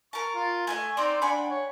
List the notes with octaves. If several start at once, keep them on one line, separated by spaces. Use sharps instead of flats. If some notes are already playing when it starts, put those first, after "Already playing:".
A#4 A5 C#6
F4
A3 B4 D#5 G#5
C4 D#4 D5
D4 F#5 G#5 B5
C#5